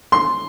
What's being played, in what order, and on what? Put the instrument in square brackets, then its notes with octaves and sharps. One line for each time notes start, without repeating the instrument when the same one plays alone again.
[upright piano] C6